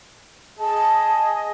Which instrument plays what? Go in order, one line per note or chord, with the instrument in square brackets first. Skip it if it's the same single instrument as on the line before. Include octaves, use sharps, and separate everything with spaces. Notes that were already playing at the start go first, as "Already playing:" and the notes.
[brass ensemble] G#4 D#5 [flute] A5